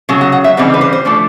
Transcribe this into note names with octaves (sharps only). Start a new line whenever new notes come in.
C#3 F#3
F#5
F#5
E5
C#3 E3 G3 C4 D#4
B4
C5
C5
F3 A3 D4